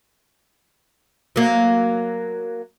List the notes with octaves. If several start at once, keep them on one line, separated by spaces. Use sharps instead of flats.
F#3 A#3